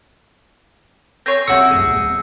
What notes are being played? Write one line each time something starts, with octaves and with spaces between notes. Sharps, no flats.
C4 G#4 C#5 G6 A#6
C3 C4 E4 F#4 A4 E6 C#7
F1 C2 G#4
D1 B3